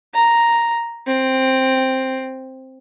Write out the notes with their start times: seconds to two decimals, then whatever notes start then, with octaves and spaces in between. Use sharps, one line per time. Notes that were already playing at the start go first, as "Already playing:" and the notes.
0.14 A#5
1.07 C4